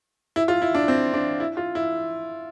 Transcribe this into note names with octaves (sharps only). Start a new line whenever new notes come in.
E4
F4
E4
D4
C4
D4
E4
F4
E4